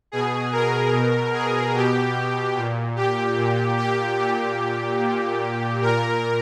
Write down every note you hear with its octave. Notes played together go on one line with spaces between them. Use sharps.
B2 G#4
A#4
B2
G#4
B2 G4
A#2
G4
A#2
G4
A#2 G4
A#2
A#2 A#4